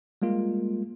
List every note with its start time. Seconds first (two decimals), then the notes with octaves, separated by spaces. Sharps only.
0.22 G3 G#3 A#3 F4